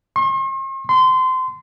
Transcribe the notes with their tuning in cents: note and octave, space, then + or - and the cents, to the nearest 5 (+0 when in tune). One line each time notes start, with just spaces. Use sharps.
C6 +45
C6 -25